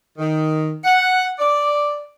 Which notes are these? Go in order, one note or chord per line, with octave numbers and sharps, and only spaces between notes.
D#3
F#5
D5